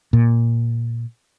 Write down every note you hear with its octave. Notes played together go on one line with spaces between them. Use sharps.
A#2